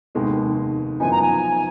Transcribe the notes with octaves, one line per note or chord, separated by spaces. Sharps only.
F1 D#2 D#3 G#3 B3
F#1 F#2 F3 B3 D#4 G#5
A#5
G#5